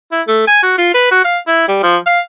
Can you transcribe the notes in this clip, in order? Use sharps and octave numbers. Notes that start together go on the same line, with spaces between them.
E4
A3
G#5
F#4
F4
B4
F#4
F5
E4
G3
F3
F5